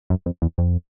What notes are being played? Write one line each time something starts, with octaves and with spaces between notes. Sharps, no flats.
F#2
F2
E2
F2